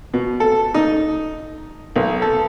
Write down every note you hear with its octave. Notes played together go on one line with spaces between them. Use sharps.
B2
A4
D#4
B1
A4